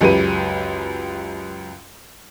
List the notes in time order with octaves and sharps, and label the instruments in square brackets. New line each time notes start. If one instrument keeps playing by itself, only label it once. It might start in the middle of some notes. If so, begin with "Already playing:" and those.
[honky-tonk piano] C#2 F#2 G4 B4 D#7